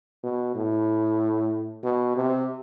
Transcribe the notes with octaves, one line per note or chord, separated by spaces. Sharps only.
B2
A2
B2
C3